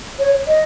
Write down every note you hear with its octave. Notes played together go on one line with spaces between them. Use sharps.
C#5
D#5